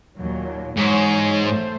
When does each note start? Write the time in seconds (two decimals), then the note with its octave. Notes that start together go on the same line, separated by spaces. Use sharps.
0.19 D#2 A#2 F#3
0.77 G#2 E3 F#3 C#5
1.45 A3 C5